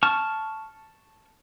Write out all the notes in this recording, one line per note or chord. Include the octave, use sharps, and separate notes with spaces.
A5 C#6 F6